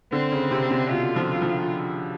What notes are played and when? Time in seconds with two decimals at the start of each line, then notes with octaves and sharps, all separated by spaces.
0.12 D3 C4
0.32 C#3
0.51 C3
0.71 C3
0.90 B2 F4
1.16 F3
1.42 F3